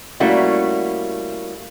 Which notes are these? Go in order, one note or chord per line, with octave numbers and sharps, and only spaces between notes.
G3 A3 A#3 C#4 E4 F#4